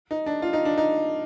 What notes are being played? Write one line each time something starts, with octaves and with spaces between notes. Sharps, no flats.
D#4
D4
F4
D#4
D4
D#4